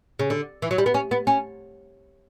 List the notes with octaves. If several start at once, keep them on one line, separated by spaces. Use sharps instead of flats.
C#3
D3
E3
F#3
G3
B3
C#4
B3
C#4